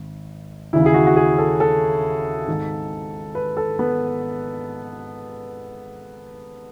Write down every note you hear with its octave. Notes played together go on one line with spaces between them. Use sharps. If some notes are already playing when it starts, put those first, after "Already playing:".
Already playing: G#1
D#2 C#3 E3 E4
G#4
F#4
F#4
G#4
A4
A4
G#1 G#2 D#3
B4
A4
B3